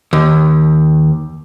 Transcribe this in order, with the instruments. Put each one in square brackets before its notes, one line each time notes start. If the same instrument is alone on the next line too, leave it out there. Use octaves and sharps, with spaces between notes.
[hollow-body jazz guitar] D#2